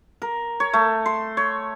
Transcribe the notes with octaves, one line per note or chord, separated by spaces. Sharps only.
A#4
C#5
A3
C6
C#5